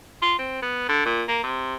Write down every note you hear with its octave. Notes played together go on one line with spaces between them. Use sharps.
F4
C4
B3
D3
A#2
A#3
C3